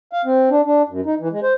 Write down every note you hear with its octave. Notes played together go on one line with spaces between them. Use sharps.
F5
C4
D4
D4
F#2
D#4
E3
G#3
C5